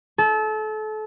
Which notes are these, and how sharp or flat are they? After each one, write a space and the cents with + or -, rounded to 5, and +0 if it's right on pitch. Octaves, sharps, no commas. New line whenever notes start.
A4 -30